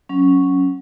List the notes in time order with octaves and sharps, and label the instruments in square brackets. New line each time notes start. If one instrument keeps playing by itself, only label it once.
[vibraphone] F#3 C#4